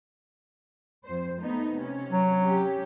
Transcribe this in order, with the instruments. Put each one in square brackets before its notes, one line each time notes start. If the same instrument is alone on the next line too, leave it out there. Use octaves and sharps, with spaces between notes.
[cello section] F2 C5
A3 B3 D#4
C3 C#4
[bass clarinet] F#3
[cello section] C#4 G4